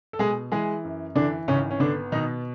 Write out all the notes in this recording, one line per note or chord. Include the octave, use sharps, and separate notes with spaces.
A4
B2 G#3 G#4
E3 G#3 G#4
F#2
D3 E3 D4
G#1 C#3 C#4
C#4
D3 B3 D4
B2 D#3 D#4